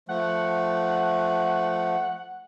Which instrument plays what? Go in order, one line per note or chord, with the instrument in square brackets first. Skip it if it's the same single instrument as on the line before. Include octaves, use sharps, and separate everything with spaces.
[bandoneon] F3 A3 [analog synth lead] F#5